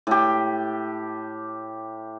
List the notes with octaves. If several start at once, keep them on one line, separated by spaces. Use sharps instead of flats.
A2 G4